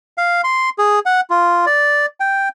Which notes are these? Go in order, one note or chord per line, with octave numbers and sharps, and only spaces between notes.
F5
C6
G#4
F#5
F4
D5
G5